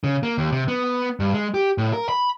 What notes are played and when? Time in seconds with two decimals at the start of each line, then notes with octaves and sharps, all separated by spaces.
0.04 C#3
0.23 A#3
0.38 D#2
0.52 C3
0.68 B3
1.20 G2
1.34 G#3
1.54 G4
1.78 A2
1.93 A#4
2.09 B5